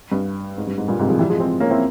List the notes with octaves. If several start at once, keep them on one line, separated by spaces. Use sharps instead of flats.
G2
G#2
G2
G#2
G2 A#2
G#2 C3
F3 G#3
E3 G3
F3 G#3
G#3 C4
A#3 C#4
C4 E4